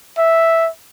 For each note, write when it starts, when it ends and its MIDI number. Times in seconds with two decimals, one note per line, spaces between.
0.18 0.69 76